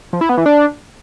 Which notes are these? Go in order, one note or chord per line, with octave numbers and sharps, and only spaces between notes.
F3
E4
B3
E3
D4